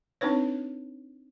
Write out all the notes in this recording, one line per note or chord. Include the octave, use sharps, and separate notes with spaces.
C4 D4 D#4 B4 C#5